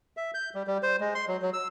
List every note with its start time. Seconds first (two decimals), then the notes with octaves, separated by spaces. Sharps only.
0.17 E5
0.34 G6
0.55 G3
0.67 G3
0.83 C5
1.00 G#3
1.15 C6
1.28 F#3
1.42 F#3
1.53 E6